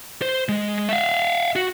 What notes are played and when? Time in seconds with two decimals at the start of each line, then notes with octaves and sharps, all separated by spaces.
0.22 C5
0.49 G#3
0.89 E5 F5
1.56 F#4